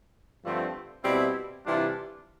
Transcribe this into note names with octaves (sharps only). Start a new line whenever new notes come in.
G2 D3 F3 A3 C4
B2 G3 C4 E4
C3 E3 G3 D4 F4